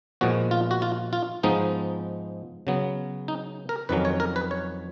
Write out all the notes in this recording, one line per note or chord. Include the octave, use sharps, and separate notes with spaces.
A#2 F3 G#3 B3 F#4
F4
F#4
F4
F4
G#2 F3 G#3 B3 D#4
C#3 F#3 B3
D#4
A#4
F2 D#3 F#3 C#4 B4
C#5
A#4
B4
C#5